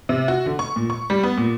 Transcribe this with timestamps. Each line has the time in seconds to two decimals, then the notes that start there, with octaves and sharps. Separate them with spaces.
0.09 C3
0.28 F#4
0.46 D3
0.59 C#6
0.76 A#2
0.90 C#6
1.10 G3
1.23 B3
1.37 A#2